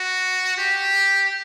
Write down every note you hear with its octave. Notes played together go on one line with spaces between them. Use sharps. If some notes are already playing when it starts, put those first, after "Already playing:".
Already playing: F#4
G4